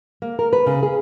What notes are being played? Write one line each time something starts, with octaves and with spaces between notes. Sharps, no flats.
A#3
A#4
B4
C#3
G#4